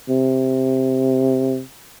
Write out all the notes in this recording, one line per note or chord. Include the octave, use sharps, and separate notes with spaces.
C3